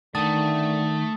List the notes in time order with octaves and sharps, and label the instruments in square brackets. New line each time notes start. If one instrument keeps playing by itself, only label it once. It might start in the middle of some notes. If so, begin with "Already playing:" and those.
[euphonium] D3 [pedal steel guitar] D#3 [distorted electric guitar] A3 [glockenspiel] A5 D#6 A6